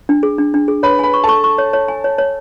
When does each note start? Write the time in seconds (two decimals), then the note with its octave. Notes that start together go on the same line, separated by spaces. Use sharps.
0.09 D4
0.23 G#4
0.38 D4
0.54 D4
0.68 G#4
0.83 B4 C#5 B5
0.99 B4 G#5 B5
1.14 C#6
1.24 A4 A5
1.29 C#6
1.44 C#6
1.58 C#5
1.73 C#5
1.88 G#5
2.04 C#5
2.18 C#5